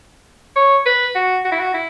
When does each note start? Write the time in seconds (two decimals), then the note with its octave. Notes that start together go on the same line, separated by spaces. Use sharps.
0.56 C#5
0.86 B4
1.15 F#4
1.45 F#4
1.52 E4
1.59 F#4
1.74 E4